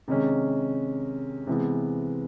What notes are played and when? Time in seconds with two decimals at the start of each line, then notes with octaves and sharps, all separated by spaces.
0.08 C3 D#3 G#3 C#4
1.47 C3 E3 G#3 B3